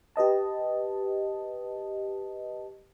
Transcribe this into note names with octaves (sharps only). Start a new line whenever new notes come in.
G4 B4 D#5 A5